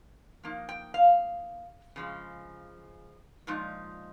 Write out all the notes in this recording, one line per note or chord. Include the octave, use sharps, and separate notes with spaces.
F3 A#3 D#4
G5
F5
C#3 F3 G#3
A#2 F3 G#3 D#4